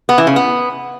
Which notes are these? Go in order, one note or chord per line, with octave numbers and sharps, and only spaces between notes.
B3
E3
C#3
B3